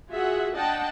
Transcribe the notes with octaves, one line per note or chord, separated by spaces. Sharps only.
F4 F#4 G#4 E5 F#5
D4 D#5 F#5 G5 A5